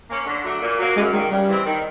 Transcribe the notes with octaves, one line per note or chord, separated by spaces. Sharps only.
A#3 C#4
D3
F#3 A3 D4
A#2
F#3 A#3
F#2 G#3
D#3 G3 G#3 A#3
C#3 G3
E3 G#3 C4
D#3